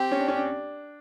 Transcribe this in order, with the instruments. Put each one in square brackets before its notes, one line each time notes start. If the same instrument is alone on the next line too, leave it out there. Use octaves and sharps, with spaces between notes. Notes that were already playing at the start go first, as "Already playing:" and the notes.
Already playing: [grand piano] C4 [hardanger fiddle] G4
[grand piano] C#4
D4
C#4
D4